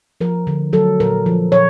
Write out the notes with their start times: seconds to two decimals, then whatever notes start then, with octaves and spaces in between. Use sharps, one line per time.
0.21 F3 A#4
0.47 D3
0.73 F#3 A4
1.00 A#2 A#4
1.26 F3
1.52 A#2 C#5